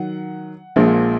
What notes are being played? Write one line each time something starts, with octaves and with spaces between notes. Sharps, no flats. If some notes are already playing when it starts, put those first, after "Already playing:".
Already playing: D#3 F#3 F#5
A#1 A#2 F3 G#3